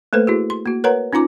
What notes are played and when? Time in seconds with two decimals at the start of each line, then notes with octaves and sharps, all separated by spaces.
0.13 A3 A#3 A4 B4 C5
0.27 E4 F#4 G#4
0.50 C6
0.66 A#3 F#4
0.84 A#4 B4 C#5 F#5 A#5
1.13 C#4 D#4 F4 A#5 D6